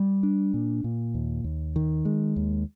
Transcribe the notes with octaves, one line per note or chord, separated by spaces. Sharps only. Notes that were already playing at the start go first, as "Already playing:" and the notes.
Already playing: G3
D4
A#2
A#2
D#2
D#2
D#3
G#3
D#2